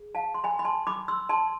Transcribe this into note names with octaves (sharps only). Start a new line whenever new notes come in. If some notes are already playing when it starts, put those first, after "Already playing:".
Already playing: G#4
F5 A5
C6
G#5 B5
B5
A5 C6
B5 D6
C6 E6
A5 C6